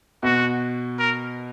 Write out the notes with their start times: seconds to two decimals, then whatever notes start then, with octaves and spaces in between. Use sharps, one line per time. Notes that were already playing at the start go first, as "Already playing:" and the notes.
0.23 B2 F#4
0.99 A#4